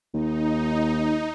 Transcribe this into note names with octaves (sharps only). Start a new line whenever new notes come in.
D#2 D#4